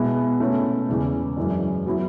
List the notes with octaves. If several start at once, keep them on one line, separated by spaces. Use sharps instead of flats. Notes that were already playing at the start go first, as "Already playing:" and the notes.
Already playing: B2 G#3 B3 E4
B2 A3 C#4 E4
E2 C#3 E3 G#3
F#2 E3 G#3 D4
F#3 B3 E4